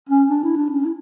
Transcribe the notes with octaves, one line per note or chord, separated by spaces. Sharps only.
C#4
D4
E4
D4
C#4
E4